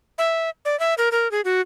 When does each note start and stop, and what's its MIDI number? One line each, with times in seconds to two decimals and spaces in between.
0.18 0.50 76
0.65 0.78 74
0.79 0.94 76
0.98 1.09 70
1.12 1.30 70
1.31 1.41 68
1.45 1.61 66